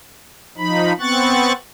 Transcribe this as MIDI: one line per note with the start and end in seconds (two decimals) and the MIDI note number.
0.58 0.93 53
0.58 0.93 63
0.58 0.93 83
1.00 1.52 59
1.00 1.52 60
1.00 1.52 85
1.00 1.52 90
1.00 1.52 93